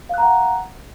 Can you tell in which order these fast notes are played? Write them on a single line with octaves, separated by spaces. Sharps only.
F5 F#6 A#5 F#5